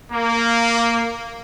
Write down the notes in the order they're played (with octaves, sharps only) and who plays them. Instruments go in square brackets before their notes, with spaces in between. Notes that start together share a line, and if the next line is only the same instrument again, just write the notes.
[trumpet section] A#3